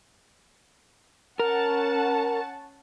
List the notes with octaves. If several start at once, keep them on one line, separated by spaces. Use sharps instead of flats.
C#4 A#4 F#5 A5